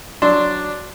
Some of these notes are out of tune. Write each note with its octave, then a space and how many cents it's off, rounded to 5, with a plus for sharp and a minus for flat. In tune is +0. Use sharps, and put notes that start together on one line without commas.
F#3 +0 D4 +0 C6 +0